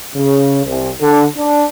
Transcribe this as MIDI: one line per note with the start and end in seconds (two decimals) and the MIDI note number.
0.15 0.60 49
0.65 0.89 36
1.01 1.23 50
1.37 1.64 62